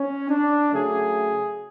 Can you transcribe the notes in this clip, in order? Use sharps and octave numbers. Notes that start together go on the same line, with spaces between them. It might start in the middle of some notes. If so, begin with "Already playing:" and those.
Already playing: C#4
D4
C#3 F#3 A3 G#4